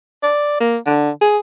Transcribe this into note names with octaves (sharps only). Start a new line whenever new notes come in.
D5
A#3
D3
G#4